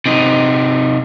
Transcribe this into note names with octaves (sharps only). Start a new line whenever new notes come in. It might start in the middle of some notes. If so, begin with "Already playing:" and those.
C3 D#4